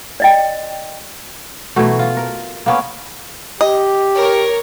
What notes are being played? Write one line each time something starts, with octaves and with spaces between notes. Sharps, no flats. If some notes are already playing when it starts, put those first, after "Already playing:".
D5 D#5 G5
B2 E3 F#3 A3
F4
A#4
A#3 B3 C#4
G4 D#5
A#4 C#5